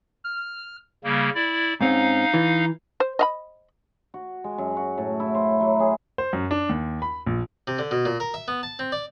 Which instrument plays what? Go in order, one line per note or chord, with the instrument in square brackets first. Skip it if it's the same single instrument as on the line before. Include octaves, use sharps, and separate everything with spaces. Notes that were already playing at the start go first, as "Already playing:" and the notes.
[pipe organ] F6
C#3 G3 A#3
E4 D5
[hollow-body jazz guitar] G#2 C4 C#4 [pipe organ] D#4 F5
[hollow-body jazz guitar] E3
[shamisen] C5
D#5 F5 B5
[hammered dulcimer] F#4
G#3
F#2
F#4
A2
E4
C5
F#3
G#4
[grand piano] C5
F#2
D4
D#2
B5
A#1
[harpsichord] C3
D3
B2
A#2
A#4
E5
B3
A5
C4
D5